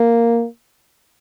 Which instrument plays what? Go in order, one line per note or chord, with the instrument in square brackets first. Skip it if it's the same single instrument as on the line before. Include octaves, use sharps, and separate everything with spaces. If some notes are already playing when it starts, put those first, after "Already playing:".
Already playing: [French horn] A#3